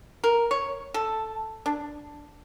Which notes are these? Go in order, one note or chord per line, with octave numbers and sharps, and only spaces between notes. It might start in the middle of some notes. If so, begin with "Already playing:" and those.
A#4
C#5
A4
D4